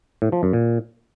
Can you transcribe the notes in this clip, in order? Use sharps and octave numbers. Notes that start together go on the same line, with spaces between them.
A2
F3
F#2
A#2